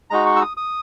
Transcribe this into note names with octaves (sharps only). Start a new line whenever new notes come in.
G#3 D#4 F#4 A#5
C#6
E6
D#6
D#6